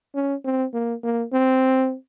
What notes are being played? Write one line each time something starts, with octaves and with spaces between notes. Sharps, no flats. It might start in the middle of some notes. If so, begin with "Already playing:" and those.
C#4
C4
A#3
A#3
C4